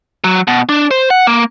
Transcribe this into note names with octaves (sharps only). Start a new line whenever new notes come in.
F#3
B2
D4
C5
F#5
A#3